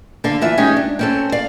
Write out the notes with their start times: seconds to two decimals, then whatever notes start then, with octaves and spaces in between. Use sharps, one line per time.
0.24 D3 A4 F5
0.41 E3 F4 E5
0.57 G#3 C#4 D#4 G4
0.76 D4
0.99 C4 C#4 A4
1.32 D5 F5